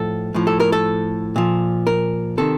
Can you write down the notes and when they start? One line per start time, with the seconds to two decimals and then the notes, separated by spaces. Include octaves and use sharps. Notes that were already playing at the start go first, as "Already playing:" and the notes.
Already playing: A2 F3 A4
0.34 A2 F3
0.47 A4
0.60 A#4
0.72 A4
1.36 A#2 F3
1.87 A#4
2.38 C3 D#3 A4